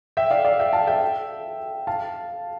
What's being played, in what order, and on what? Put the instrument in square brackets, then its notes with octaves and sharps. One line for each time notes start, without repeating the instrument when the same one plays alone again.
[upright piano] E5 G5
D5 F5
D5 F5
E5 G5
F5 A5
E5 G5
F5 A5